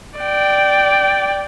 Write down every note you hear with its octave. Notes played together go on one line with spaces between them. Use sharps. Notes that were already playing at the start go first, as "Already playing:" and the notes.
D5 G5